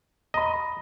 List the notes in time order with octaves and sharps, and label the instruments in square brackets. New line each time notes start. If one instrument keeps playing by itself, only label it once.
[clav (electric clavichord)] D#5 [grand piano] A#5 B5